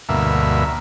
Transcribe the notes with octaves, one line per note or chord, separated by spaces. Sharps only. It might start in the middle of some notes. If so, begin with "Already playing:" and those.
D2 G2 B2 A#3 E5